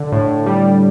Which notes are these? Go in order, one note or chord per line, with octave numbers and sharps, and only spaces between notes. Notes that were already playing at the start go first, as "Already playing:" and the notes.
Already playing: D3
A2
G3